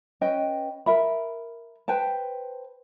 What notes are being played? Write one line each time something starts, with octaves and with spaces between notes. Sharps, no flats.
C#4 B4 D#5 G5
A#4 E5 B5
B4 C5 G5 A5